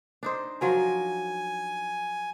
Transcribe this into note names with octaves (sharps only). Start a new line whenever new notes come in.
D4 D#4 C5
F3 F#3 A#4 G#5